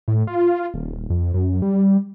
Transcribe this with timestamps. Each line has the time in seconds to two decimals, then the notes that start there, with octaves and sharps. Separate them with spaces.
0.08 A2
0.27 F4
0.74 D#1
1.10 F2
1.34 F#2
1.62 G3